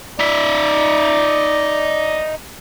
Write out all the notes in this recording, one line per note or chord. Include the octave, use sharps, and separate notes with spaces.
D#4 D5 E5